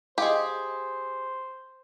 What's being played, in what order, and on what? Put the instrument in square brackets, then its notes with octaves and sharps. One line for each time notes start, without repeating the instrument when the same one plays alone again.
[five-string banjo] G4 G#4 [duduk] C5 [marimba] D#5 F5